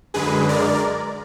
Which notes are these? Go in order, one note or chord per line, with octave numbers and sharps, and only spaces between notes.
F#2 D3 G#3 G#4 B4
A#4 D5